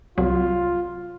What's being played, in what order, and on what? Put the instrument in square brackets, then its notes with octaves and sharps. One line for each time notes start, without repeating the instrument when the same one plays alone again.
[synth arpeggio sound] C2 F#3 [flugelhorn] F4